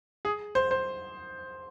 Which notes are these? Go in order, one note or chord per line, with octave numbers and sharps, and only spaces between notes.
G#4
C5
C5